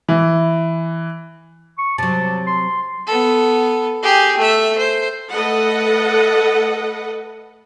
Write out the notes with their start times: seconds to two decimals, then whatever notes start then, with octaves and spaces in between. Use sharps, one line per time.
0.08 E3
1.78 C#6
1.98 C3 F#3 A5
2.47 C6
3.07 B3 A4
4.03 G4 G#4
4.38 A3 E5
4.78 C5
5.31 A3 A4 B4 D#5 F#5